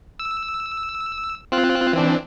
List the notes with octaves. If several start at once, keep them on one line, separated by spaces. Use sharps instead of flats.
E6
C4 F4 F#6
E3 C4 D4